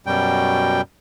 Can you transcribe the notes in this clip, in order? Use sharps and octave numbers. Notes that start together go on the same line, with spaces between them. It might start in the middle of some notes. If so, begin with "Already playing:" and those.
F#2 B2 G3 G5